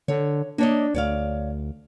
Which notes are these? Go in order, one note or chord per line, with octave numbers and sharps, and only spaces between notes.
D3 C#5
A#3 D4 C#5 D#5
D2 C#5 D5 F5